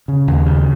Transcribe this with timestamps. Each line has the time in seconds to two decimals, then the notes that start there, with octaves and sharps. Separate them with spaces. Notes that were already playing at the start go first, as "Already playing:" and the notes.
0.08 C#3
0.27 D#2
0.46 C#3